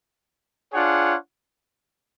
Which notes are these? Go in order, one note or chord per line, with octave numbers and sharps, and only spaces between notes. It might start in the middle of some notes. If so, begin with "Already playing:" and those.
D4 F4 G#4 C#5 F#5